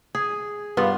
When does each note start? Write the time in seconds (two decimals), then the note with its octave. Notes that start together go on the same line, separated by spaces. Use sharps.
0.15 G#4
0.77 G2 B3 F4